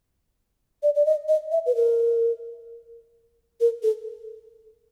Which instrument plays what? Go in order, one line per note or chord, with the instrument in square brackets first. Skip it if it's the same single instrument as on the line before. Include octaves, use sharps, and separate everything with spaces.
[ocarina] D5
D5
D#5
D#5
E5
B4
A#4
A#4
A4